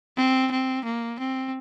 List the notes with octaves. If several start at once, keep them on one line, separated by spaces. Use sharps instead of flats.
C4
C4
A#3
C4